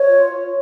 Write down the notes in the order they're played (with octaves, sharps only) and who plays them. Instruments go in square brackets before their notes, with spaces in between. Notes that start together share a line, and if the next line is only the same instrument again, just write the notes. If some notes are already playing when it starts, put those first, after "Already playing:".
Already playing: [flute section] C#5
F4